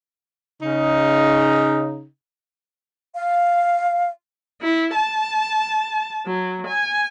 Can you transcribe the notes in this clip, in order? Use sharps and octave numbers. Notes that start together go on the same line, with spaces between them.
C#3 D#4
F5
E4
A5
F#3
G#5